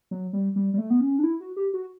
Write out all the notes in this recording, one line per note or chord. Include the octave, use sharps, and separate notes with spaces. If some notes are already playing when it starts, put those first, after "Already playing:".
F#3
G3
G3
G3
A3
B3
C#4
D4
E4
F#4
G4
F#4